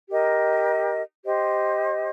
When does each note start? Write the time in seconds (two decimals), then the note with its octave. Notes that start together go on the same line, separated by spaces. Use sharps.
0.09 G4 A#4 D#5
1.24 G4 C5 D#5